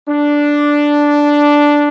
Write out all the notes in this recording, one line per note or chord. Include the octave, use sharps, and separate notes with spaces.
D4